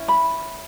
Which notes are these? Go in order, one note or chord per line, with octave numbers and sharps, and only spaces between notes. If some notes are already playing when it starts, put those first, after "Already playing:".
Already playing: C#4 E4
B5